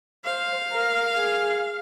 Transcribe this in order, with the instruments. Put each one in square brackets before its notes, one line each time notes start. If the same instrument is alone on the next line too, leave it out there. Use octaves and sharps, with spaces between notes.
[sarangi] C5 [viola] F5
[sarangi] A#4
G#4